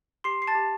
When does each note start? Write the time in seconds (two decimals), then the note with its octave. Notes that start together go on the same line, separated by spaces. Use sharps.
0.24 G4 C6 C7
0.42 C7
0.47 A5 A6
0.55 G4